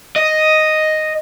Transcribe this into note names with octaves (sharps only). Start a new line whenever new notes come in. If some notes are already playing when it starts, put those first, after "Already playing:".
D#5